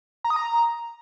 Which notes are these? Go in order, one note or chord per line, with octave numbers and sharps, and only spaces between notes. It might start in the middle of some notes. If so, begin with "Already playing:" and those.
A#5
D#6
A#5